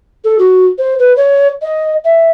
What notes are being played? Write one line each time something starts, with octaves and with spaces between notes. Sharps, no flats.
A4
F#4
C5
B4
C#5
D#5
E5